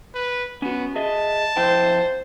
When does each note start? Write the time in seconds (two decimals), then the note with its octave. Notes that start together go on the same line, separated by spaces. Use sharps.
0.14 B4
0.62 B3 C#4 F#4
0.96 G#4 D#5 E5 A5
1.57 F2 E4 C5 G5